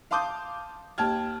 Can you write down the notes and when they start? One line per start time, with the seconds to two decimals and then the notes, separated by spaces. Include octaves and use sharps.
0.11 F5 A5 C6 D6 D#6 G6
0.98 D#2 G5 A5 F6 G#6